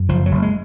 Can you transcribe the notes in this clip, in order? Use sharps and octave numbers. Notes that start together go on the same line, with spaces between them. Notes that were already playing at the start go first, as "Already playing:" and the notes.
Already playing: F#2
F#1 F3
F#3
F#1
G#3